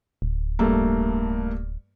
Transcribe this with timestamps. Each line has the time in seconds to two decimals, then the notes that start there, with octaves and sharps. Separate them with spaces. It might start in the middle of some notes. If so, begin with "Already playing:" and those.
0.22 D1
0.59 G2 A3 A#3